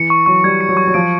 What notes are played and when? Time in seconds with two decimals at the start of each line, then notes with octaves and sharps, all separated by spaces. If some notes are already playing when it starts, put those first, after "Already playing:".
Already playing: E3 C#7
0.10 C#6
0.26 F#3 C#6
0.44 G3 G#6
0.61 C#7
0.69 F#3
0.77 C#6
0.87 F#3
0.94 F3 D7